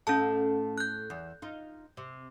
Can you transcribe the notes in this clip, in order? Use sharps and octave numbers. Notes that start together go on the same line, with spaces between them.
A2 A3 C#4 A4 A5
F#6 G6
E2
D#4 F4
C3